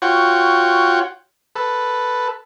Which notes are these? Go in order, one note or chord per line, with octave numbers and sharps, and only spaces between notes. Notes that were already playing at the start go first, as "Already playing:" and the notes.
F4 F#4 C#5 F#5 G5
A4 B4